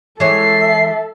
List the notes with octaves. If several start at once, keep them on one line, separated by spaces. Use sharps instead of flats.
E3 G#3 A4 C#5 E5 C7